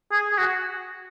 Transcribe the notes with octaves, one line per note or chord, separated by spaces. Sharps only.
G#4
G#4
F#4